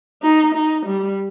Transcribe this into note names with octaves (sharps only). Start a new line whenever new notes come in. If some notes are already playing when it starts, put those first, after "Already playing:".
D#4
D#4
G3